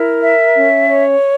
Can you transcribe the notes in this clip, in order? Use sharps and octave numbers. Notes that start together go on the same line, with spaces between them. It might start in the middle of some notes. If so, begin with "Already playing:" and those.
Already playing: E4 A#4
E5
C#4
C#5